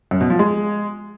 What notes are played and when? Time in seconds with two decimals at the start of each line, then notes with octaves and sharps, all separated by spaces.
0.11 F#2
0.21 B2
0.30 F3
0.39 G#3